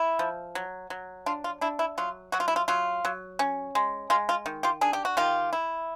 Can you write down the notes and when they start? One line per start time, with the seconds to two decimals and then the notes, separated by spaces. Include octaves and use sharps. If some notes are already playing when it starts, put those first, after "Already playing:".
Already playing: E4
0.19 F3
0.55 F#3
0.90 F#3
1.26 D4 F4
1.44 F4
1.61 D4 E4
1.79 E4
1.98 F#3 F4
2.32 F#3 F#4
2.40 F4
2.48 E4
2.56 F4
2.68 F#3 F4
3.05 F#3
3.39 C#4
3.75 G#3
4.10 G#3 F4
4.29 F4
4.46 D#3
4.63 F4 G4
4.81 D4 G#4
4.93 G4
5.05 F#4
5.17 D#3 F4 G4
5.53 E4